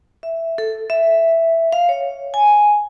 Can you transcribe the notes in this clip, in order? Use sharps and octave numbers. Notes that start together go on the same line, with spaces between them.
E5
A4
E5
F5
C#5
G#5